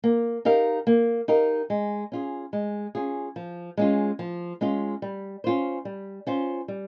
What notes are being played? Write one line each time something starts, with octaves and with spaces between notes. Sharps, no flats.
A#3
D#4 G4 A#4 F5
A#3
D#4 G4 A#4 F5
G#3
C#4 F4 G#4
G#3
C#4 F4 G#4
F3
G#3 C#4 F4
F3
G#3 C#4 F4
G3
C#4 F4 C5
G3
C#4 F4 C5
G3